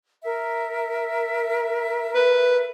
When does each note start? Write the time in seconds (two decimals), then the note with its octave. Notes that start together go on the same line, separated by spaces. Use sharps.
0.23 A#4 E5
2.15 B4